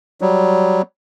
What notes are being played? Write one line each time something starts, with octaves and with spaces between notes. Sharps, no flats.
F#3 G3